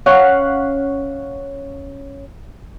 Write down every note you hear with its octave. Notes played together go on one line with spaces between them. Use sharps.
C#4 F5 F#5